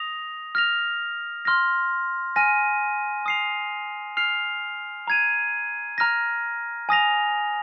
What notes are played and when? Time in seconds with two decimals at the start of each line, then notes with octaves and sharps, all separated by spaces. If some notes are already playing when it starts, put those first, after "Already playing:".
Already playing: D#6 A#6 F7
0.55 F6 A#6 F7
1.45 C6 F6 A#6
2.36 G#5 F6 A#6 D#7
3.26 D#6 C7 F7
4.17 F6 C7 F7
5.07 A#5 G#6 D#7
5.98 A#5 F6 A#6
6.89 G#5 D#6 A#6 F7